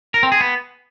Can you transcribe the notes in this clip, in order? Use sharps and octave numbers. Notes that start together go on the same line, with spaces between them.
A#4
C4
G#4
B3